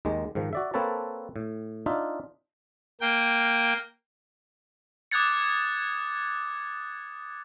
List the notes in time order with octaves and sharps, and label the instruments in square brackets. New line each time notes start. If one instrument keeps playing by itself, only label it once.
[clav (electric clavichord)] D#2 D#3 G#3
G#2 D#3 F3
F#4 D5 E5
A#3 C4 A4 B4 C#5 A5
A2
D4 D#4 F4 E5
[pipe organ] A#3 G5
[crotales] D6 D#6 F#6 G#6 A6 C#7